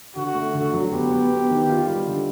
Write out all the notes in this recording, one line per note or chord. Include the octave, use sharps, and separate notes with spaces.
D3 F#4
A3
D3
F#3
B3 G4
B3
B3
D#3
F4
G3
D3